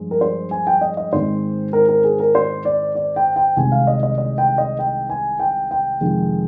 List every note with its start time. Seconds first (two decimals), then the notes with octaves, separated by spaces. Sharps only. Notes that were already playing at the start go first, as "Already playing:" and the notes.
Already playing: G2 F3 G#3
0.11 A#4
0.21 C5
0.51 G#5
0.67 G5
0.81 D#5
0.97 D#5
1.12 G#2 D#3 G#3 C4 C5
1.73 A#4
1.89 A#4
2.04 G#4
2.20 A#4
2.35 C5
2.65 D5
2.95 D5
3.16 G5
3.36 G5
3.56 C2 C3 D#3 G#3 G#5
3.72 F5
3.87 D#5
4.03 D#5
4.18 D#5
4.38 G5
4.58 D#5
4.79 G5
5.10 G#5
5.40 G5
5.71 G5
6.01 F2 C3 D#3 G#3